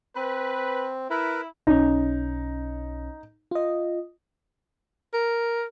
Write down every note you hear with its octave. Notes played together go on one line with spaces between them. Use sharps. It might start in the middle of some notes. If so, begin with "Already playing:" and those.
C4 B4
E4 A#4 B4
B1 C#4 D#4
F4 D#5
A#4